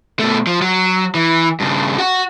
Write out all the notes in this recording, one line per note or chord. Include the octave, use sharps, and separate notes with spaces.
B2 A3
F3
F#3
E3
G2 C#3
F#4 F#5